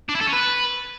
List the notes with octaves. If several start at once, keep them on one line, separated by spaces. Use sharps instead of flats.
D4
E4
A4
C#4
B4